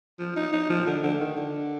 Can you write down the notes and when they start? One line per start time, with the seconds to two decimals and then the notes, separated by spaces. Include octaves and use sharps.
0.19 F3
0.36 D#4
0.53 D#4
0.70 F3
0.87 D3
1.03 D3
1.21 D#3
1.37 D3